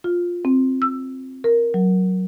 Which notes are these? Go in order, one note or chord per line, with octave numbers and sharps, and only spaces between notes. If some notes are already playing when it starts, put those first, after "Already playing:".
F4
C4
E6
A#4
F#3